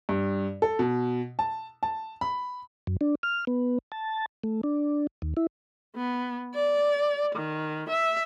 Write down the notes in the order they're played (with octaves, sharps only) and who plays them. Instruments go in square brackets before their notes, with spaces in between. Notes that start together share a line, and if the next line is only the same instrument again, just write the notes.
[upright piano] G2
A4
B2
A5
A5
B5
[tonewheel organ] F#2
D4
F6
B3
A5
A3
D4
D#2
E4
[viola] B3
D5
D#3
E5